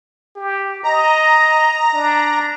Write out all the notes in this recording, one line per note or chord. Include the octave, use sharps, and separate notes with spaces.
G4
D#5 A#5
D4